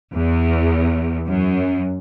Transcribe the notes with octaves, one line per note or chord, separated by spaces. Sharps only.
E2
F#2